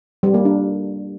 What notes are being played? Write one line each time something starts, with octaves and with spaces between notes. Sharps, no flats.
G3
A#3
D4